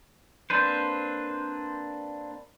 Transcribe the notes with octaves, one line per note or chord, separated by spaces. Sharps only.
A#3 C4 D4 B4 C5